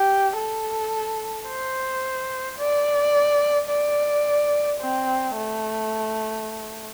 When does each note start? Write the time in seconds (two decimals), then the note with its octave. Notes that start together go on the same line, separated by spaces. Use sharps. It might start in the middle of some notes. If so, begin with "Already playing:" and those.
Already playing: G4
0.37 A4
1.48 C5
2.59 D5
3.70 D5
4.81 C4
5.36 A3